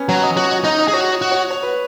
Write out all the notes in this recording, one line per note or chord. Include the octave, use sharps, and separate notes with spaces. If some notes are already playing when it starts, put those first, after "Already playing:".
Already playing: B3 C#4
F#3 C#5
D#5
F#4 C#5
D#5
D#4 D#5
D#5
G#4
F#4 C#5
D#5
F#4
C#5
C#5
B4